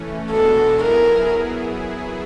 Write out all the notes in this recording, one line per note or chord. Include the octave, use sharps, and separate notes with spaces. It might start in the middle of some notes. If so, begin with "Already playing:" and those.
Already playing: E3 A3 C#4
B2 G#3 B3 D4 F#4 A4
F#3 B3 E4 G#4 A#4